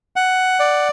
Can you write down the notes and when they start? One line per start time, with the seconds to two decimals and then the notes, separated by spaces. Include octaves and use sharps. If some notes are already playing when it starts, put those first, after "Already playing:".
0.16 F#5
0.60 D5